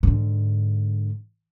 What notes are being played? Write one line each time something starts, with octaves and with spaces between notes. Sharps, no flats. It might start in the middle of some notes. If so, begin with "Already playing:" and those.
G#2 D3